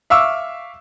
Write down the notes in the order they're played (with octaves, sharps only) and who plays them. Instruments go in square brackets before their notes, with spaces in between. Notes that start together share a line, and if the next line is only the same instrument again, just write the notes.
[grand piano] E5 F5 C#6 D6 E6